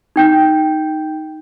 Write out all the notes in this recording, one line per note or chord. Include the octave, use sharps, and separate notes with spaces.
D#4 G5 G6